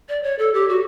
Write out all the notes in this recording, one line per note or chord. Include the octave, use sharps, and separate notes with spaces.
D5
C#5
A4
G4
F#4